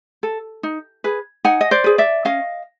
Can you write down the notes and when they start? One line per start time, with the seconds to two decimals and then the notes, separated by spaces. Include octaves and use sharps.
0.23 A4
0.63 D#4
1.04 G#4 B4
1.44 D#4 F#5 G#5
1.61 D#5
1.71 C5 D5
1.84 G#4 B4
1.98 D5 E5
2.25 C#4 D#5 F5